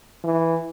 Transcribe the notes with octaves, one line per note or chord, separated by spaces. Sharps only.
E3